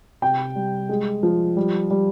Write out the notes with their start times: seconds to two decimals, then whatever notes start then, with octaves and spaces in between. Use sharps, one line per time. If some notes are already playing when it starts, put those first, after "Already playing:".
0.22 C3 G5
0.56 G3
0.89 G#3
1.23 F3
1.57 G3
1.90 G3